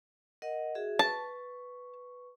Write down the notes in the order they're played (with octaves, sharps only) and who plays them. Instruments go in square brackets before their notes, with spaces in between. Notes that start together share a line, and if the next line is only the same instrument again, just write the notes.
[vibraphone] A#4 D#5 F#5
F#4 G#4 E5
[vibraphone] B4 C#6 [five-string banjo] A5